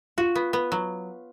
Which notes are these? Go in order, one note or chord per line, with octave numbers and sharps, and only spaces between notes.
F4 F#4
B3
B3
F#3